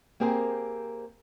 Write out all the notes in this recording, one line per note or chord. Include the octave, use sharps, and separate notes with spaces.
A#3 C4 G4 G#4 A#4 C5